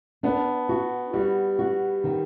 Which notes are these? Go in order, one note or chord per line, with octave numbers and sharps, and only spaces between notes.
B3 D4
F#4
G3 F#4
F#4
D#3